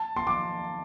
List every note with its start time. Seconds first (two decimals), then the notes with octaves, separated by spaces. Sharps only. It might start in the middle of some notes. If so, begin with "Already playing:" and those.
Already playing: A5
0.16 C6
0.27 D6